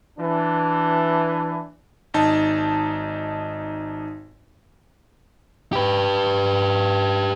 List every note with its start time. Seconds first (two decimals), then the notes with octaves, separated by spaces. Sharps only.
0.18 E3 D4
2.14 G#1 D#4 A5
5.73 G4 B4